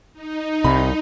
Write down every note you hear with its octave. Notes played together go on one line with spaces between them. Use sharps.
D#4
C2 C3 B5